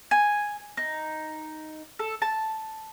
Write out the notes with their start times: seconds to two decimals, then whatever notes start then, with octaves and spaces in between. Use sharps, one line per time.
0.11 G#5
0.77 D#4
1.99 A4
2.22 A5